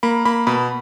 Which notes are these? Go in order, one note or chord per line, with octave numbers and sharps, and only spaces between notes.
A#3 B5
A#3 B5
B2 B5